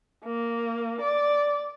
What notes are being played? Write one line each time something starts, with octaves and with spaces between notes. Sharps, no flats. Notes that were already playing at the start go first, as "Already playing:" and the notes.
A#3
D5